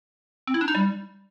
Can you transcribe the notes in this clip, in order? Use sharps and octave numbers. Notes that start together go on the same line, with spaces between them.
C4
E4
D4
D#4
G3